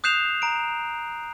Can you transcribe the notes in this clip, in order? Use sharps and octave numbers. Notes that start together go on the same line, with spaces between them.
D#6 F#6 G6 C7 E7 F7
A#5 D7